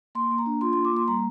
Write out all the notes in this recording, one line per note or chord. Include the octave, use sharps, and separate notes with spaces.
A#3 C6
A#3
A#5
D4
F4 C6
A#3 C6
D6
A#3 C6
G3 A#5